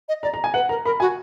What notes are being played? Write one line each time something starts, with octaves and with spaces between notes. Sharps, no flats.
D#5
D5 A#5
A#5
G#5
B4 F#5
A#4 A#5
A#4 B5
F#4 G#5